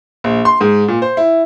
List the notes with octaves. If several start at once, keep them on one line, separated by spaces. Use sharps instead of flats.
A#1
C6
G#2
A#2
C5
E4